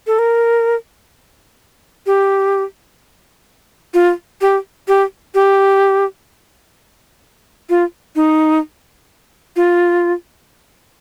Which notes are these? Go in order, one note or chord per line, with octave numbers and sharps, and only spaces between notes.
A4
A#4
G4
F4
G4
G4
G4
F4
D#4
F4